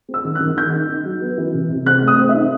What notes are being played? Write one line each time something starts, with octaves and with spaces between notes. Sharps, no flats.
C4
E6
D#3
F#6
D#3
D#4 G6
D#4
D#4
F#3
B3
E3
C3
C3
C4 F#6
A3
D#6
C4
E5
D#4